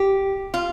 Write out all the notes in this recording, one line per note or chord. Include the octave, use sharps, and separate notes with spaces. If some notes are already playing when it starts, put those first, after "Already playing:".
Already playing: G4
F4